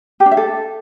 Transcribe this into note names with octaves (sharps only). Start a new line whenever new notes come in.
G4
D4
E5
A4